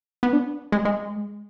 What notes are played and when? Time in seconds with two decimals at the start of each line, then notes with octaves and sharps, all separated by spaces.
0.23 B3
0.33 D4
0.72 G#3
0.85 G#3